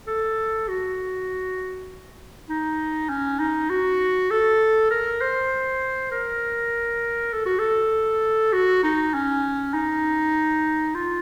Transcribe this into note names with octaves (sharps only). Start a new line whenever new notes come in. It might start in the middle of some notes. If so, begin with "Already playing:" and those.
A4
F#4
D#4
C#4
D#4
F#4
A4
A#4
C5
A#4
A4
F#4
A4
F#4
D#4
C#4
D#4
F4